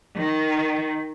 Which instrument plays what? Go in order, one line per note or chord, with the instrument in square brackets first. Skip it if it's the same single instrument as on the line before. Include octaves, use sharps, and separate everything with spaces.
[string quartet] D#3